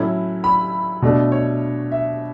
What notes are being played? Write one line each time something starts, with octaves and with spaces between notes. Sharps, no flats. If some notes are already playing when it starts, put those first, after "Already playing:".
Already playing: A2 F#3 C#4 E4
B5
B2 A3 D4
C#5
E5